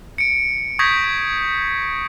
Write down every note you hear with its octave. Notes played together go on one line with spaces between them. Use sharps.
C#7 D7
C#6 D#6 G6 G#6 A#6 B6